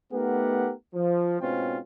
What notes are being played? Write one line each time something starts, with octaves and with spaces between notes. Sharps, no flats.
A3 B3 D#4 G4 A#4 F#5
F3
G#2 B2 C4 C#4 F4 G5